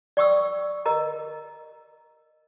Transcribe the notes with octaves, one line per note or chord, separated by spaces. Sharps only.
D5 G5 C#6 D#6 E6
A#4 D#5 A#5